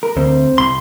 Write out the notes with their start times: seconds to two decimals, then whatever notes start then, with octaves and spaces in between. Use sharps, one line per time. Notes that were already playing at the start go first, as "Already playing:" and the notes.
0.03 A#4
0.17 D2 C4
0.58 C2 C6